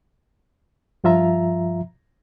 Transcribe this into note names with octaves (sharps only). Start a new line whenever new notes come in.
G2 F3 F4 E5 A#5